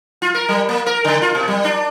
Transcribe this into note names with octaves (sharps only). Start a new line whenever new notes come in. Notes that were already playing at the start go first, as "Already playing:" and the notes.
F4
A#4
G3
A#3
A#4
C#3
F4
B2
G3
D4